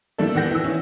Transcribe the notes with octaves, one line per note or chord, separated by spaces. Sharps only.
D#3 G3 A#3 D4 E4 A4
E2 D#3 F#5 G5 G6 A#6
E3 E6
C#4 E4